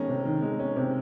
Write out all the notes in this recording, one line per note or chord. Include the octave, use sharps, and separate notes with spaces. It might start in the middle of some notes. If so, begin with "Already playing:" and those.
Already playing: D#3 G#3 C#4 A#5
C3
D#3
G#3
C#4
C3